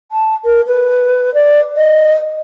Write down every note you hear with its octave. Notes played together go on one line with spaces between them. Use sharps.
A5
A#4
B4
D5
D#5